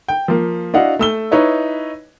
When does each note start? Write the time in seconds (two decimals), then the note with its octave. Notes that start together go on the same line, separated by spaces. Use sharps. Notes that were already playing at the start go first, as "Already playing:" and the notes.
0.08 G5
0.28 F3 A#3
0.74 D4 E4 F#4 D#5 F5 F#5
0.99 A3 E6 G7
1.31 D#4 E4 B4 C#5 D#5